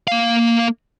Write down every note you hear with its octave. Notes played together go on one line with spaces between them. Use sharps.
A#3 F5